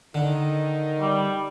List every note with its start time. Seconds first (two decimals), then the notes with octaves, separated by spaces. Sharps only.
0.15 D3 D#3 D#4
1.01 G3